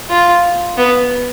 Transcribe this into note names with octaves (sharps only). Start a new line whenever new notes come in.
F4
B3